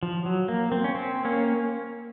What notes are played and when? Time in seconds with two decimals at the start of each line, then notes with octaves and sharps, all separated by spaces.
0.03 F3
0.25 F#3
0.48 A#3
0.72 C4
0.84 C#4
0.95 C4
1.25 A#3 C#4